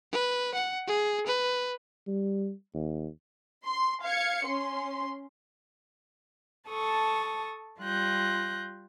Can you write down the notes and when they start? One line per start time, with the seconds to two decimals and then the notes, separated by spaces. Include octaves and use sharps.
0.12 B4
0.54 F#5
0.87 G#4
1.26 B4
2.07 G3
2.74 D#2
3.64 C6
4.03 F5 G#6 C#7
4.44 C#4 C6
6.69 A4 A5 C#6 D#6
7.81 G3 F4 F#6 G6 A#6